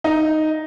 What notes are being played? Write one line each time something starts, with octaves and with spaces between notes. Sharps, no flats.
D#4